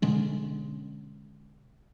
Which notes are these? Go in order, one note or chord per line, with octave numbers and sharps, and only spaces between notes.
B2 D3 G#3 C#4